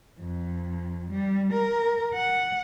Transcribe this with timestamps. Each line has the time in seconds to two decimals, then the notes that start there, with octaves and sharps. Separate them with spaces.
0.18 F2
1.11 G3
1.53 A#4
2.14 F#5